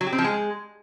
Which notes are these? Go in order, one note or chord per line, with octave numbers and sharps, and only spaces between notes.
F#3
G4
C4
F3
G#3